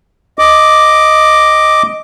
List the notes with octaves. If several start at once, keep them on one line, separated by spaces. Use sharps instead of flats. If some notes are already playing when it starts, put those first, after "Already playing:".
D#5 D6